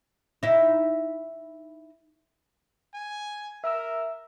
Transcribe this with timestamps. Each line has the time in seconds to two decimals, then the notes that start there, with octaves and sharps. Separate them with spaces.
0.43 D#4 E4
2.94 G#5
3.64 A#4 E5 E6